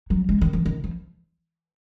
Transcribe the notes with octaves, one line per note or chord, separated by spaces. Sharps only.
F#3
G#3
D#3
F3
D#3
F3